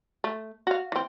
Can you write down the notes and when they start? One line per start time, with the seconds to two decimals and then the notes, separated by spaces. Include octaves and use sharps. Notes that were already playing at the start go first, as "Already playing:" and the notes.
0.24 A3
0.67 F#4 F5
0.92 E3 C4